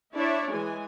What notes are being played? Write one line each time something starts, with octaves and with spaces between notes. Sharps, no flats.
D4 E4 C#5 D5 E5
E3 G#3 G#5